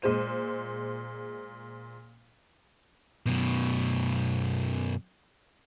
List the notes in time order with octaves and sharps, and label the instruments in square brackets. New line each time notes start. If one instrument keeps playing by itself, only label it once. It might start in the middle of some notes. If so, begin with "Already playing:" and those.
[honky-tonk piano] A#2 G#3 C5 D#7
[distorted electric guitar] F#2 B2